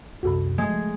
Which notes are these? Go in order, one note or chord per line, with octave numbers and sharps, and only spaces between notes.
C2 F#2 C3 F#4 A4 B5
G#3 A3